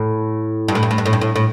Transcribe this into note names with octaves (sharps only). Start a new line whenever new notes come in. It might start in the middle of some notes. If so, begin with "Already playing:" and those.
Already playing: A2
G2
A2
G2
A2
G2
A2
G2
A2
A2